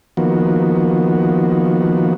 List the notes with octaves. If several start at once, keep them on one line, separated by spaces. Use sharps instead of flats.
D#3 F3 A#3 B3 F#4